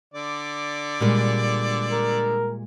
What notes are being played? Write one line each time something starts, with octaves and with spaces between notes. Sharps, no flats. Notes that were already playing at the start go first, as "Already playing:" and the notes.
D3 D5
A#2 G3 G#3
A#4